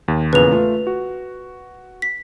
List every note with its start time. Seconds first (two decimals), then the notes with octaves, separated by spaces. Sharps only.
0.08 D#2
0.33 E2 A#2 C#3 B4 F7
0.51 A3 F4
0.87 F#4
2.02 B6